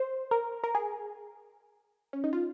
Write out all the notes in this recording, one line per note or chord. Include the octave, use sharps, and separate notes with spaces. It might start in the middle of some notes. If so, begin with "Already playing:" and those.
Already playing: C5
A#4
A#4
G#4
C#4
D#4
F4